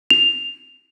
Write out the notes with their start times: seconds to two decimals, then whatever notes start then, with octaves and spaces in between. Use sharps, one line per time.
0.10 F7